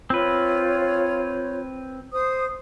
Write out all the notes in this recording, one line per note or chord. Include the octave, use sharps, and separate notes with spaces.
C4 F4 B4 C#5
C5 D#6